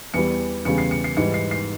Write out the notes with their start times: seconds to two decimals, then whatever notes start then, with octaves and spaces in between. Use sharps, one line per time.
0.14 E2 E3 G3 C#7
0.65 E2 C#3 G3 C#7
0.78 C7
0.91 C#7
1.04 C7
1.17 G#2 E3 G3 C#7
1.34 C7
1.51 C7